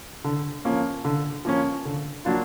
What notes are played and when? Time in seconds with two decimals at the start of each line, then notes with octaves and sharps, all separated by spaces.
0.24 D3
0.65 F3 A#3 C#4
1.05 D3
1.45 F3 A#3 C#4
1.85 D3
2.25 F#3 A#3 D4 F4